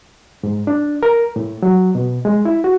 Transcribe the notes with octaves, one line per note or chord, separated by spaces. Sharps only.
G#2
D4
A#4
A2
F#3
B2
G#3
E4
F#4